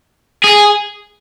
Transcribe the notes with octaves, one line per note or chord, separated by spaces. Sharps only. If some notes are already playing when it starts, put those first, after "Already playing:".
G#4